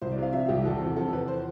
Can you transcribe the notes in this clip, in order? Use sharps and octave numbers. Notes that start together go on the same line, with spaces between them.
C2 C5
D5
C3 F5
F3 E5
C2 G4
E2 A4
C3
F3 A4
E2 B4
C5